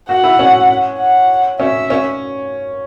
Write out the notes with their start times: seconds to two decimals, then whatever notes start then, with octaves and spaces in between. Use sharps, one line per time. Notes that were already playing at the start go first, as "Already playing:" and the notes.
0.09 F#4 F#5
0.24 E4
0.39 C#4
0.99 F#5
1.60 C#4 E5
1.90 C#4